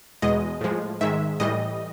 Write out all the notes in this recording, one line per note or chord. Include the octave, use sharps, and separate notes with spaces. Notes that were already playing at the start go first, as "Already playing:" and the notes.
E2 B2 G#3 D#5
A2 F3 G#3
G#2 D#3 G#3 E5
A2 E3 G3 D#5